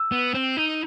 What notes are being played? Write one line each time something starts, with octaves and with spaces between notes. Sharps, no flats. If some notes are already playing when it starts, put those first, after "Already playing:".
Already playing: E6
B3
C4
D#4